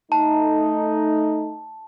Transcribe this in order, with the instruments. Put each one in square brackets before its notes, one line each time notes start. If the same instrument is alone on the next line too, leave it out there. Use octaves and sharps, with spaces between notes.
[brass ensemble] A3 D#4 [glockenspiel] A5